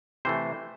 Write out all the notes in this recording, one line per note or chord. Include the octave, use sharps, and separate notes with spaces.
C3 E3 A3 C5